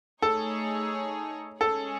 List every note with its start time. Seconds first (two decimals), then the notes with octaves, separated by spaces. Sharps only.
0.22 A3 D#4 G#4 A4 C#5
1.61 G#3 C#4 G#4 A4 C#5